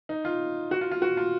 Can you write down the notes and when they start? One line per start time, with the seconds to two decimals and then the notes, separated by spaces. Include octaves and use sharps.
0.09 D#4
0.25 F4
0.71 F#4
0.81 F4
0.91 F4
1.02 F#4
1.17 F4